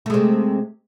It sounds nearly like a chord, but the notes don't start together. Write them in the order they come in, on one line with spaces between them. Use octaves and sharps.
A3 G#3 C3